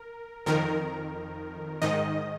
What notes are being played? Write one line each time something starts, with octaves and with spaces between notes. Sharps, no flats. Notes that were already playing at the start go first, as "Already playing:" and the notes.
Already playing: A#4
F2 D#3 A#4
G#2 D#3 D#5